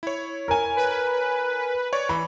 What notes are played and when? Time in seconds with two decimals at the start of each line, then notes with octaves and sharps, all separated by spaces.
0.03 E4 C#5
0.48 A#4 G#5
0.76 B4
1.93 C#5 D5 C#6
2.09 E3 B5